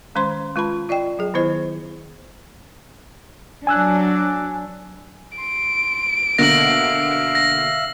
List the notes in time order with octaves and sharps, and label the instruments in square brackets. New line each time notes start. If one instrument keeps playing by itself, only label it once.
[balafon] D#3 G#3 C#4 C5 C6
G#3 F4 B4 A5 B5
F4 D5 D#5 G5
F#3 G#4
D#3 B3 E4 C5 D#5
[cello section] F#3 D4 [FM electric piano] G#5 E6 F#6
[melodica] C6 [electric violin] D7
[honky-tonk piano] B2 D3 A#3 [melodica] E5 F5 [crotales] A#6 F#7
[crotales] A#6